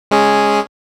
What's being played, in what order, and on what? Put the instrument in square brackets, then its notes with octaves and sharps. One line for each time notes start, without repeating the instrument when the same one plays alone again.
[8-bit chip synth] G#3 C#4 G#4